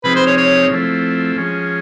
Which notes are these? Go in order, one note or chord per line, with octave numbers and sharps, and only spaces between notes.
C3 F3 G#3 C4 D#4 B4
C5
C#5
C#5
F3 A3 C4 E4
F3 G#3 C#4